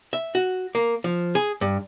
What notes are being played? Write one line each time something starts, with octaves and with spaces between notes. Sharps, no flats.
E5
F#4
A#3
F3
G#4
G2